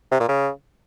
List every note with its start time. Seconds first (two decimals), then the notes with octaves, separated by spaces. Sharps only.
0.11 C3
0.20 A#2
0.29 C#3